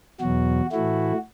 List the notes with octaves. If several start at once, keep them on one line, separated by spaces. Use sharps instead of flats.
E2 B2 F#3 F#4
A2 E3 A3 E4 F#4